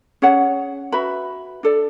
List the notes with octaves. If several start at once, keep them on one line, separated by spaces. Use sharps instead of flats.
C#4 G#4 C#5 F#5
F#4 B4 E5 B5
D4 A4 D5